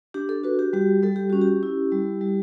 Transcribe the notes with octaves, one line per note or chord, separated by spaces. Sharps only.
D4 G4
A4
F#4 B4
G4
G3 G4
G3 A4
G4
C#4 F#4
G4
E4
G3
G3